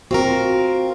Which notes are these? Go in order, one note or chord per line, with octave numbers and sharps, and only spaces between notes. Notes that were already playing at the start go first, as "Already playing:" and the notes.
C4 F4 F#4 A#4